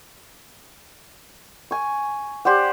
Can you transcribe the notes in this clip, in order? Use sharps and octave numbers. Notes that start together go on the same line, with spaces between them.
G#5 C#6
G4 C5 D5 F#5